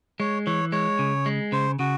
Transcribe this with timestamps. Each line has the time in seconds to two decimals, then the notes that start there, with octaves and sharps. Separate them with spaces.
0.20 G#3 C#5
0.46 E3 C#5
0.72 G#3 C#5
0.99 C#3
1.26 G#3
1.52 C#3 C5
1.79 C#3 F#4